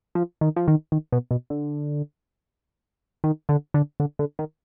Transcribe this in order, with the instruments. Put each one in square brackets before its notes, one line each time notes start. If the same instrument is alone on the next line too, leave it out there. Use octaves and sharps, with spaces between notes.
[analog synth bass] F3
D#3
F3
D#3
D#3
B2
B2
D3
D#3
D3
D3
D3
D3
D#3